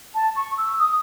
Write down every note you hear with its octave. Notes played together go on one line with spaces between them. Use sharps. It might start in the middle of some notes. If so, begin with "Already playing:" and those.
A5
C#6
E6
D#6